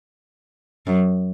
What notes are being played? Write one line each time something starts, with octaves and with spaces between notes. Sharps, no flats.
F#2